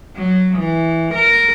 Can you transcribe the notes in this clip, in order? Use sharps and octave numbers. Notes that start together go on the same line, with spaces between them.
F#3
E3
A#4